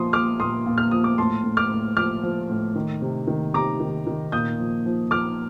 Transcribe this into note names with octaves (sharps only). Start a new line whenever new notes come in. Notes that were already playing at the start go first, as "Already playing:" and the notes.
Already playing: A#2 F3 C6 D#6
F3 D6 F6
A#2 C6 D#6
A#2
F6
F3 D#6
D6
A2 A5 C6
A2
D6 F6
A2
F3 D6 F6
F3
A2
D#3
C3
D#3
C3 A#5 D6
D#3
D#3
A#2 D#6 G6
F3
F3
F3 D6 F6